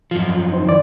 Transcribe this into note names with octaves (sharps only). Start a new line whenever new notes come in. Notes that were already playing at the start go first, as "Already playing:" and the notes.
F#2 F3 F4
D#4 C5
D#3 E3 D5